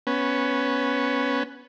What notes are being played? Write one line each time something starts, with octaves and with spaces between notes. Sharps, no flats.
B3 C#4